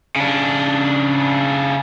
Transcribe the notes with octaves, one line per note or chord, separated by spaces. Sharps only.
C#3 D4